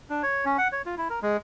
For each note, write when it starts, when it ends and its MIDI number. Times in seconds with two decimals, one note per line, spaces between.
0.10 0.22 62
0.23 0.45 73
0.45 0.57 61
0.58 0.68 78
0.72 0.82 73
0.86 0.95 65
0.98 1.08 64
1.10 1.19 70
1.22 1.37 56